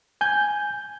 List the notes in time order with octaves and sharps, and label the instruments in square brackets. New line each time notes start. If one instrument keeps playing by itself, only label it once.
[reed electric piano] G#5 G6